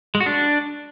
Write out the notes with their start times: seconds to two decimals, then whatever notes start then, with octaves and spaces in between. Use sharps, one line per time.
0.15 G#3
0.20 F#4
0.26 D4